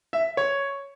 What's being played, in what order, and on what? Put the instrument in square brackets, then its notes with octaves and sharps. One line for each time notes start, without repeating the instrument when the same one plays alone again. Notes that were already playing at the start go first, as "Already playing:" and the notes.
[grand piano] E5
C#5